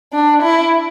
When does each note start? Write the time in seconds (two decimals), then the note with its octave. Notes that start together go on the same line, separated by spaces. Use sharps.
0.13 D4
0.42 E4